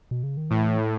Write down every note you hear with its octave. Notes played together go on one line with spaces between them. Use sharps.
B2
C#3
D#3
A2 E3